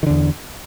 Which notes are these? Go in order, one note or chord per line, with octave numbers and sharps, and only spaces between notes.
E2 D3 D#3